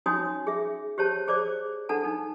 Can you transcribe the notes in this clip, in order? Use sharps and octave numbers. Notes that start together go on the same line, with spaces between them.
C#4 D#4 F#4 C#5 G#5 D#6
G#4 E5
G4 C5 C#5 A5
G#4 C5 D5 D6
D4 A4 F#5 A5
D#4